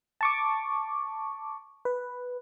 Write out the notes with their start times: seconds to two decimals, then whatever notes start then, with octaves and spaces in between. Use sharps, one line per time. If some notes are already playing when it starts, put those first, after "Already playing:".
0.21 A5 C#6 D6
1.85 B4